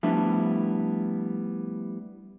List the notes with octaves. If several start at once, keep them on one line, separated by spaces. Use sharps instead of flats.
F3 G3 A3 B3 D4 E4